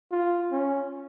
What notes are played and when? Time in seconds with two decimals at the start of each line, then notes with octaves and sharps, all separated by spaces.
0.11 F4
0.52 C#4